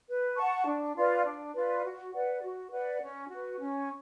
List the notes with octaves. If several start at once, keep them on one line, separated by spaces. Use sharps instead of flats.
B4
F#5 A5 C#6
D4
F4 B4 D5
D4
F4 B4 D5
F#4
B4 D5 F#5
F#4
B4 D5 F#5
C#4
F#4 B4
C#4